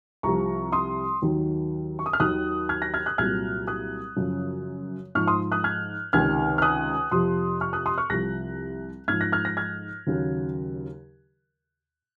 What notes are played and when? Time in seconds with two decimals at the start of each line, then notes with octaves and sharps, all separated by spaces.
0.23 C2 C3 F3 A#5 C#6
0.72 C6 D#6
1.22 D#2 D#3 F#3
1.99 C#6
2.06 D#6
2.13 F6
2.20 D#2 D#3 F#3 D#6 F#6
2.69 F6 G#6
2.82 F#6 A#6
2.94 F6 G#6
3.06 D#6 F#6
3.18 C2 A#2 F#3 F6 G#6
3.67 D#6 F#6
4.16 F#2 C#3 F3
5.15 G#2 F3 C#6 F6
5.27 C6 D#6
5.52 D#6 F#6
5.64 F6 G#6
6.13 C#2 C3 D#3 F6 G#6
6.58 F6
6.62 D#6 F#6
7.11 F2 C3 F3 C6 D#6
7.61 C#6 F6
7.73 D#6 F#6
7.86 C6 D#6
7.98 C#6 F6
8.10 C2 C3 F3 F#6 A#6
9.08 G#2 F3 F6 G#6
9.21 F#6 A#6
9.32 F6 G#6
9.45 F#6 A#6
9.57 F6 G#6
10.07 D#2 C#3 F#3